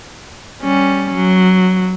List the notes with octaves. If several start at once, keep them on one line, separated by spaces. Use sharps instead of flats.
G3 C#4
F#3